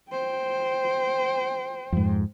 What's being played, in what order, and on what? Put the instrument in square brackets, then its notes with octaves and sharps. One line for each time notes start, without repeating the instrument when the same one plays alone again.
[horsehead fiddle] C5 G5
[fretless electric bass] F2 G#2